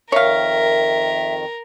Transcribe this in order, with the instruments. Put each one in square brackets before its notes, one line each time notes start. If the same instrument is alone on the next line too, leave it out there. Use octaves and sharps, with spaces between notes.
[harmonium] F2 D#3 [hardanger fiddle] A#4 [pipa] C#5 F5 [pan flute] E5